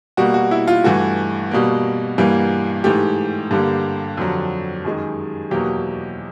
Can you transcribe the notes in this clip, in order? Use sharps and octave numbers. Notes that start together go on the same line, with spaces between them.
B2 G3 A#3 F#4
F#4
E4
F4
G2 E3 A3 F#4
B2 G3 A#3
G2 E3 G3 A#3
G#2 E3 A3 G4
G2 D3 G3 A#3
F2 D3 F#3
F#2 D#3 G#3
E2 B2 F#3 A#3 G4